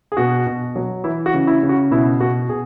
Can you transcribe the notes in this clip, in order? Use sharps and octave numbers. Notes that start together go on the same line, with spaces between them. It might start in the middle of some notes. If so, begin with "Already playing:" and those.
G#4
B2 F#4
B2
F#3
E3 E4
F#4
C#3
E4
C#3
F#4
B2 E4
B2 F#4
B2 G#4